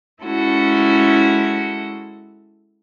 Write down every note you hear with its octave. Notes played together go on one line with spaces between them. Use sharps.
G#3 C#4 E4 F#4 A4